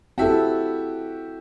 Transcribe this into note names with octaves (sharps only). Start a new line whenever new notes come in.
C4 E4 F#4 G4 A4 E5